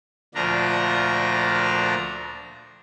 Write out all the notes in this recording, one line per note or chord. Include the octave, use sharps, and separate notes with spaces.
D2 A#2 F3 D4 A#5